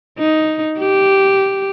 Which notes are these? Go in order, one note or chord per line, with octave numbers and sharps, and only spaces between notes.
D#4
G4